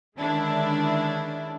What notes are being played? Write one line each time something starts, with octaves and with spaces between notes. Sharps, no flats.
D3 D#3 G#3 C#4 D4 E4